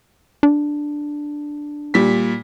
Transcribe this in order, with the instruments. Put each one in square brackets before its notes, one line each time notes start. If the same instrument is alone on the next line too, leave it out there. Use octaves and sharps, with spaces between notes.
[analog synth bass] D4
[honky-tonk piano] A#2 G3 B6